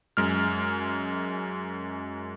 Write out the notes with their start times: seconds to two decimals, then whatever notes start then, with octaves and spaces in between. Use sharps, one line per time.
0.17 F#2 G#3 F6